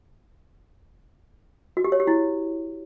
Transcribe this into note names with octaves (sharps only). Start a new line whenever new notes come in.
F#4
G4
C#5
G4
E4